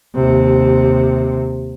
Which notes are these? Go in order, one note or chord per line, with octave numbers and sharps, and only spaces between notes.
D#2 C3